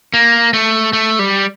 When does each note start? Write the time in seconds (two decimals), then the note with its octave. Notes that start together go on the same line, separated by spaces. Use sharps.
0.14 A#3
0.53 A3
0.93 A3
1.19 G3